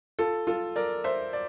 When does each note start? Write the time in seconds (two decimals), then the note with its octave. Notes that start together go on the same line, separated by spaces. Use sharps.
0.19 F4 A4
0.47 F4 A4
0.76 A#4 D5
1.04 C5 E5
1.33 D5